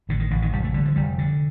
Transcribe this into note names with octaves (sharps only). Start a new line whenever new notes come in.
A1 D3
D#3
A1 D3
D#3
F1 G3
A3
D3 G3
F3
F1 G3
D3